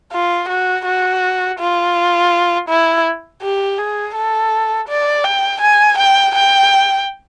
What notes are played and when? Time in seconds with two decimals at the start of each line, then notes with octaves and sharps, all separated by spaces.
0.12 F4
0.49 F#4
0.85 F#4
1.59 F4
2.68 E4
3.42 G4
3.78 G#4
4.15 A4
4.89 D5
5.24 G5
5.61 G#5
5.98 G5
6.35 G5